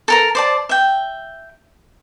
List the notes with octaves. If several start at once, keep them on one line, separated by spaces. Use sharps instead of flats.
A4 A#4 A#5
C5 D5 A5
E5 G5